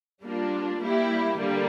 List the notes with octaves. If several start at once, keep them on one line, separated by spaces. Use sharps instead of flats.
G3 A#3 D4 F4
G3 A#3 E4 G4
D3 G3 A#3